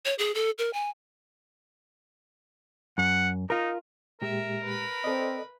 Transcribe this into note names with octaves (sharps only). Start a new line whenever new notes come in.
C#5
G#4
A4
A#4
G#5
F#2 F#5
D#4 F4 A#4
A#2 G#3 G4 A#4 E5
B4 B5
C4 A4 D5 D#5